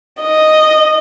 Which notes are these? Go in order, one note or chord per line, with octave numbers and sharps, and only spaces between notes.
D#5